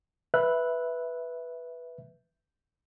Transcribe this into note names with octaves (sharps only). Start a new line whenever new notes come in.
B4 E5 F#6